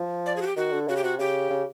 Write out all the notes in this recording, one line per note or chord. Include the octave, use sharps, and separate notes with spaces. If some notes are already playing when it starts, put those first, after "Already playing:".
Already playing: F3
D5
G#4
F#4
G4
D#3 F#4
D3
C#3 F#4
G4
C3 F#4
C#3 G4
C#3